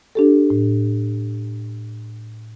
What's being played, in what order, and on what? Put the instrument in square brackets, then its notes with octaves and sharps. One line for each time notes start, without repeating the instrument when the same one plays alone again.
[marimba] D4 G4 A4
A2